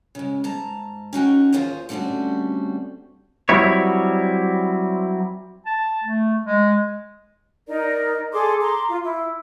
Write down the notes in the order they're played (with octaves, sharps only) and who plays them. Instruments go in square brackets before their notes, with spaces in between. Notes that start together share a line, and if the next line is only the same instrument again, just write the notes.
[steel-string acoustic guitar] C#3 G#3
G#2 A5 A#5
C#4 D#4 F#4 G5
D#2 B3 F4 G#4 C5 C#5
D3 G3 A3 C4 C#4 F#4
[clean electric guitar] F#3 G3 C4 E4 C#5
[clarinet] A5
A3
G#3
[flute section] D#4 A#4 D5
G#4 A4 C6 D6
A#5 C6 D6
F4
E4